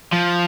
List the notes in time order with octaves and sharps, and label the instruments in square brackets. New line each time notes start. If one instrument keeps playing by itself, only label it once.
[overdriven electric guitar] F3